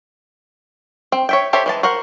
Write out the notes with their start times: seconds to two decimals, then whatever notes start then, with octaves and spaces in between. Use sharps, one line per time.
1.12 C4
1.29 C#5 E5 G5
1.53 G4 A4 C5 C#5 E5
1.66 E3 G#3 A5
1.83 F#4 A#4 C5 F#5